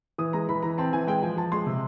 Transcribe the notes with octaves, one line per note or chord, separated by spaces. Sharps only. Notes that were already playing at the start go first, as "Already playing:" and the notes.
E3 D#6
G#3 A#5
E3 B5
E3 A#5
C4 A5
E3 G#5
G#3 G5
F3 G#5
F3 A5
G#3 C6
C3